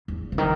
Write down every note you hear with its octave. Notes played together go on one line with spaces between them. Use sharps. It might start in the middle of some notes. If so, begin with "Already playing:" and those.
E2
C#3
D#3